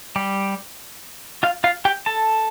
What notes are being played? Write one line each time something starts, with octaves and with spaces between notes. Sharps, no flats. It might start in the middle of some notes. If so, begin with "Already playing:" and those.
G3 G4
F4 F5
F4 F5
G4 G5
A4 A5